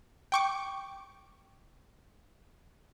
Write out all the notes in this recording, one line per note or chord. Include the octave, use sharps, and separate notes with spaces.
G5 C#6 D6